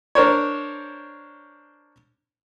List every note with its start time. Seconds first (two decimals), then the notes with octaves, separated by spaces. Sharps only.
0.15 D4 A#4 C5 C#5